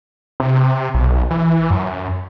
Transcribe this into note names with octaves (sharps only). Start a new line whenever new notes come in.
C3
B1
E3
F#2